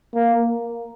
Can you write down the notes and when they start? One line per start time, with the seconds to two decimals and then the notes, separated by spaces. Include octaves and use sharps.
0.15 A#3